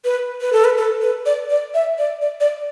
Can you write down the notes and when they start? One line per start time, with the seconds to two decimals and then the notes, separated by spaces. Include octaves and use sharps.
0.05 B4
0.41 B4
0.52 A4
0.64 B4
0.77 A4
1.01 B4
1.26 D5
1.50 D5
1.74 E5
1.98 D5
2.21 D5
2.40 D5